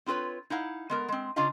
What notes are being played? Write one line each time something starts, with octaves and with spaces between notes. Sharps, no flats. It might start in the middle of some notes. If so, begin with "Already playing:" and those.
C4 F4 F#4 B4 C#5
D#4 E4 F5 F#5
G#3 B3 A#4
G#3 C4
C#3 D4 F4 D#5 F5 A#5